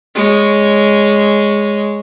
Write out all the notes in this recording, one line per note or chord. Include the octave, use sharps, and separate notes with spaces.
G#3 C#5